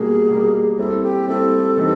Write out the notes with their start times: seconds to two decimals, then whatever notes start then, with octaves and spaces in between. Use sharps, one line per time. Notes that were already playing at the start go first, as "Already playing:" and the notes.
Already playing: B2 G3 A#3 G#4
0.29 B2 G3 A#3
0.78 G3 C4 E4 A4
1.03 G4
1.28 G3 C4 E4 A4
1.77 E3 G3 C4 D#4 G4